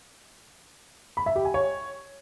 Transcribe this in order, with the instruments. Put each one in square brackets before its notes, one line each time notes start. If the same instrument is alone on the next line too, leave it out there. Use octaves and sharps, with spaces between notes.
[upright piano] B5
E5
G4
G#5
C#5